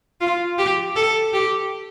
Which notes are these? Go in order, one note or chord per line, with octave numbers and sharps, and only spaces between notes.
F4
G4
A4
G4